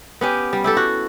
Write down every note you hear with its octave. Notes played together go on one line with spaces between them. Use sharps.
B3 C#4 G4
G3
E4 G4 A4
F#4